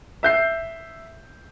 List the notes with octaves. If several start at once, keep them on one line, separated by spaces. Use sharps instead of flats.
E5 G6 C7